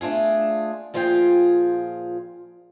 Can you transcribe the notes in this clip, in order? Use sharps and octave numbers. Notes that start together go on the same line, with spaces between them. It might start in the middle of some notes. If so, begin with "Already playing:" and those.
A3 D4 F4 G#4
A#2 F3 F4 G#4 F5 G5